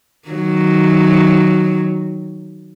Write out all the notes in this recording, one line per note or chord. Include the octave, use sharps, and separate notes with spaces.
D#3 F#3